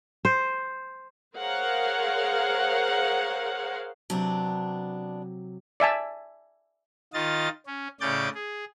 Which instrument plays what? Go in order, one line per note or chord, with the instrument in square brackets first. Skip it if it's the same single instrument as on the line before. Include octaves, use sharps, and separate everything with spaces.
[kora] C5
[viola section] G#4 A#4 C5 C#5 F5 F#5
[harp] C3 F#3 [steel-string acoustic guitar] B3 D4
[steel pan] D5 E5 G#5 A5
[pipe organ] D#3 F4 D#5 A6
C#4
A2 C#3 C#4 D5 G6 A6
G#4